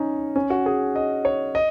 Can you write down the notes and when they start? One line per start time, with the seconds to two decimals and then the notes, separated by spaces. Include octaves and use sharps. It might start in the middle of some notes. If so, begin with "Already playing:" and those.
Already playing: C#4 D#4
0.36 C#4
0.50 F#4
0.66 G#4
0.96 D#5
1.25 C#5
1.55 D#5